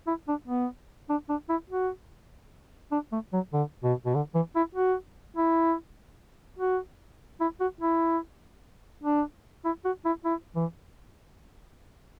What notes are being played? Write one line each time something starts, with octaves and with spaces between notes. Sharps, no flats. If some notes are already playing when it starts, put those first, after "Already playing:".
E4
D4
B3
D4
D4
E4
F#4
D4
A3
F#3
D3
B2
B2
D3
E3
E4
F#4
E4
F#4
E4
F#4
E4
D4
E4
F#4
E4
E4
E3